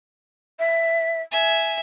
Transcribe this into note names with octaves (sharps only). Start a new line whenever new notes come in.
E5
E5 G#5